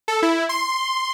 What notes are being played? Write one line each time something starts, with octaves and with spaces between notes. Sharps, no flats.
A4
E4
C6